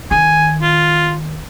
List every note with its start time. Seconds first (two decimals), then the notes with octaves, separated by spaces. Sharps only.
0.11 D#3 G#5
0.62 F4